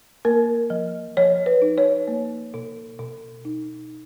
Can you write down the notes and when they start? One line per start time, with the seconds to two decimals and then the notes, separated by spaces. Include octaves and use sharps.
0.25 A#3 A#4
0.70 F3
1.17 F3 C#5
1.46 B4
1.62 D#4
1.78 C#5
2.08 A#3
2.54 B2
2.99 B2
3.45 D#4